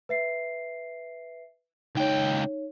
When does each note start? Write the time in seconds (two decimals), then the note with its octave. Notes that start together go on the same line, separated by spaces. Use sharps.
0.09 B4 E5 C7
1.95 C#2 D#4 C#5 G5